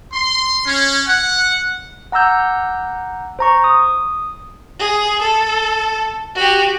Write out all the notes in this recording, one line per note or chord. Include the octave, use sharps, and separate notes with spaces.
C6
C#4
F#5
F#5 A#5 D6 E6 G6
C5 A#5 C#6
D#6
G#4
A4
F#4 G4